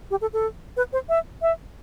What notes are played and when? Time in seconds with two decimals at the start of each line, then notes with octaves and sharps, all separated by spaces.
0.11 G4
0.21 A4
0.33 A4
0.77 B4
0.93 C5
1.09 E5
1.42 E5